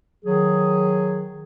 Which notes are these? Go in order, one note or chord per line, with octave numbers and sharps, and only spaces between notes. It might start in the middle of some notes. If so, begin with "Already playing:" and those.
D#3 F#3 G#4